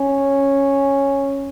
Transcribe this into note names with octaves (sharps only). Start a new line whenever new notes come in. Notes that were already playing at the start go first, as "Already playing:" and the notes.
Already playing: C#4